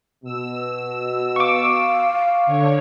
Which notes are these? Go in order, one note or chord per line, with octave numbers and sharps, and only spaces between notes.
B2 E6
F5 C#6 D6
D3 C#5